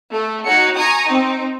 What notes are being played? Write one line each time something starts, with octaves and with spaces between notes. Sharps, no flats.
A3
D#4 F#4 C#5 C#7
G#5 A#5 C#6 D#6
C4 D#4